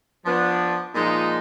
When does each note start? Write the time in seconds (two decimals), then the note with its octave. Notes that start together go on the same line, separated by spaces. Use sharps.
0.24 F3 B3 D4
0.94 A#2 F3 G#3 D#4